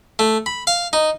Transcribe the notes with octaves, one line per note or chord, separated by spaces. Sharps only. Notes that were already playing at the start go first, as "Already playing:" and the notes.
A3
B5
F5
D#4